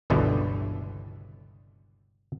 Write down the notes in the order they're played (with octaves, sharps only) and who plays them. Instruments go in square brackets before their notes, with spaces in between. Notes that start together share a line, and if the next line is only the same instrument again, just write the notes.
[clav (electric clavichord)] G1 C#2 B2 D3 E3 G3